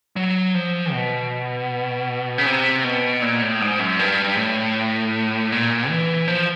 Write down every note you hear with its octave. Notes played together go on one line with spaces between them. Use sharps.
F#3
F3
B2
C#3
C3
B2
A#2
A2
G#2
F#2
G2
A2
A#2
E3
F3